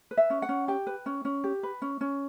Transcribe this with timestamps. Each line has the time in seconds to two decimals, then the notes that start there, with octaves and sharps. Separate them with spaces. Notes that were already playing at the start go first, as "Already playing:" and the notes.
0.11 B4
0.17 E5
0.30 C#4
0.42 F#5
0.49 C#4
0.68 G4 G5
0.87 B4
1.06 C#4
1.25 C#4
1.44 G4
1.63 B4
1.82 C#4
2.01 C#4